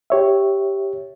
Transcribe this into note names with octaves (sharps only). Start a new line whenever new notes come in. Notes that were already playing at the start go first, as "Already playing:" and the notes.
G4 C#5 E5